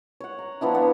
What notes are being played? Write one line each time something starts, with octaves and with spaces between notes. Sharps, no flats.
C#5 F#5
A#5
F3 B3 D4 E4
B3